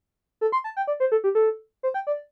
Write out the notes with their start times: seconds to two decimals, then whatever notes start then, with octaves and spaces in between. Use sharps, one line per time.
0.41 A4
0.52 C6
0.64 A5
0.77 G5
0.87 D5
1.00 C5
1.12 A4
1.24 G4
1.35 A4
1.83 C5
1.94 G5
2.07 D5